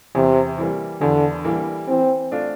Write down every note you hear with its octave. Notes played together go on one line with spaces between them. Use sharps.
E2 C3
E3 G3 A#3
E2 D3
E3 G3 A#3
E3 C4
A3 D4 F4